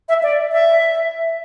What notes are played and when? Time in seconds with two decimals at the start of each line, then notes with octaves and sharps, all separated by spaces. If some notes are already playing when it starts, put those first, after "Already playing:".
0.09 E5
0.23 D5
0.52 E5